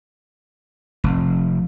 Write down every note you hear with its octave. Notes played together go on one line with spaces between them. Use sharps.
F1